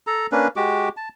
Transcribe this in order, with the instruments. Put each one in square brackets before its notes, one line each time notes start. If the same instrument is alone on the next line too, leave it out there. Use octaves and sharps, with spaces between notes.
[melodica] A4 A#5
A#3 C#4 D4 B4
G#3 F#4 G4 D6
A5